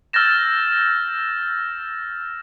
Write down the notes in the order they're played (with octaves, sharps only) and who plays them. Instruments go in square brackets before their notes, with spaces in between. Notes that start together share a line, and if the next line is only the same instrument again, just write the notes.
[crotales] E6 F6 G6 A6 A#6 E7